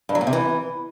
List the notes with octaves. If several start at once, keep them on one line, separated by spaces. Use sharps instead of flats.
G2
F#3
A#2
C3
E3